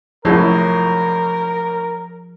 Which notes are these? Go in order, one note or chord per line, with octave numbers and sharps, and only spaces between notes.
C2 F#2 A2 F3 G#4 A#4